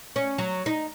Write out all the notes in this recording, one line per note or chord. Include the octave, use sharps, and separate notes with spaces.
C#4
F#3
D#4